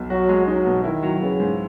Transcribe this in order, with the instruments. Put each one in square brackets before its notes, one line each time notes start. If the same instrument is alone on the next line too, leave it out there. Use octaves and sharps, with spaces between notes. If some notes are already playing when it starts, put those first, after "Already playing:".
Already playing: [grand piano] B1
[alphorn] F#3 [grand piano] F#4
[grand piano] G#3
[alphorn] F#3 [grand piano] D#4
[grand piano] B2
[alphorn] D#3 [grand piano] E4
[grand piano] F#3
[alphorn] C#3 [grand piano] B3
[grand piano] G#2